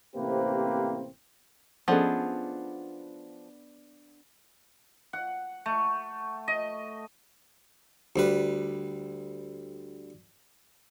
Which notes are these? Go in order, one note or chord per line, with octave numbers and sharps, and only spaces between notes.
A1 C3 A#3 C4 G4 B4
F3 B3 C#4 D4 G#4 A4 D#5 F#5
F#5
A3
D#5
D2 G3 B4